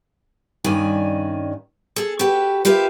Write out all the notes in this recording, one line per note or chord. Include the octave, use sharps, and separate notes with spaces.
G2 D#3 C#4 D5 D#5 G#5
G#4 A4
F#4 G4 A4 B4 G5
F4 G4 A#4 B4 E5